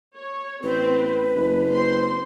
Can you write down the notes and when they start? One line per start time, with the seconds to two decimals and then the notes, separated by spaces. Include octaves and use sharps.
0.16 C#5
0.63 A1 C4 B4 C5
1.35 F#1 A#3
1.70 C4 C5 C6